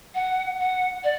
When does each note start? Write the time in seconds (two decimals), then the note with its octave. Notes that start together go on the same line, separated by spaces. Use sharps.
0.15 F#5
0.59 F#5
1.04 D5